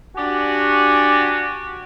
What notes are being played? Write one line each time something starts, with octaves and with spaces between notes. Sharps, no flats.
D4 F#4 G4 G#5